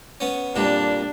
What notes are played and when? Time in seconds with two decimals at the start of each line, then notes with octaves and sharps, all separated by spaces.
0.20 B3 C#4
0.56 F2 A#2 G3 D4